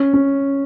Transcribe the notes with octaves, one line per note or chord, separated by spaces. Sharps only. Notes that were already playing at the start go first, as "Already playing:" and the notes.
Already playing: C#4
C#4